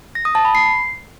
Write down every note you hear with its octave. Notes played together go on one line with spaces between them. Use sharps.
A#6
D#6
A5
B5
C7